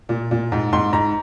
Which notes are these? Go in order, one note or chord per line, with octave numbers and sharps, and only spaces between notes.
A#2
A#2
G#2
G#2 C6
G#2 A#5